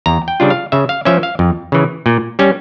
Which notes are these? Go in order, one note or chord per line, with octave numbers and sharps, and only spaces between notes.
E2 A#5
G5
C#3 G3 D4 F4
F5
C#3 E5
F5
F3 C#4 E5
F5
F2
C#3 E3
A#2
G3 C#4